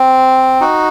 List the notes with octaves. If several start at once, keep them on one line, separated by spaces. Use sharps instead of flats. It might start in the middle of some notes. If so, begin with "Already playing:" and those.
Already playing: C4
D#4 F#4